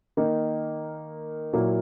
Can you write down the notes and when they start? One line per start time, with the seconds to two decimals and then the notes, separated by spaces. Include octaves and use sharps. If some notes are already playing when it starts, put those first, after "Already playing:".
0.17 D#3 A#3 D#4
1.53 A#2 F#3 A#3 E4